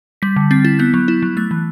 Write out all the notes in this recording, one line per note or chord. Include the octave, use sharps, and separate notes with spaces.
G3 B6
D3
C4 A6
E4 A6
B3 G6
F#3
E4
F#3
A3 F#6
E3